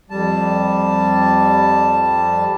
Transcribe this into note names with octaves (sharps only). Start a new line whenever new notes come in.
F2 G3 A5